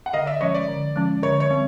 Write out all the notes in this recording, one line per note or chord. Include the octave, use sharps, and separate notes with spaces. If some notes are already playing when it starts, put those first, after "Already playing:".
F#5
D3 D#5 F5
D5 E5
F3 G#3 C#4 C#5 D#5
D5
D3
F3 G#3 C#4
D3 C#5
C#5
G3 C4